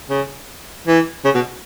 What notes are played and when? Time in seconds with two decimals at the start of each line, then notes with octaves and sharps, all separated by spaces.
0.09 C#3
0.87 E3
1.25 C#3
1.35 B2